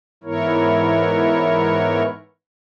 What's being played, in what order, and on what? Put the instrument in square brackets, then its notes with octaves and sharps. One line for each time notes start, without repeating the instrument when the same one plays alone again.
[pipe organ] G#2 E3 B3 E4 A#4 C#5